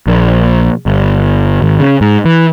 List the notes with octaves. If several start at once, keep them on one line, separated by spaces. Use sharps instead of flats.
A#1
G1
G#1
C#3
G#2
E3